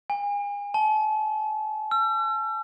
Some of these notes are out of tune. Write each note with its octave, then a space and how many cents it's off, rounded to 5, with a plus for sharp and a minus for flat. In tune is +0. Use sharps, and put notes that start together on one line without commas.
G#5 -35
A5 -35
E6 +40